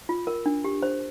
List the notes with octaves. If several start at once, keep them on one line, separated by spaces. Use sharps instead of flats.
F4
A#4
D4
G4
C5